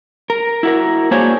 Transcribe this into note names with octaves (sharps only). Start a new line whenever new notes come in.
A#4
E4 F#4 A#4
A#3 D4 F#4 G#4 C5 C#5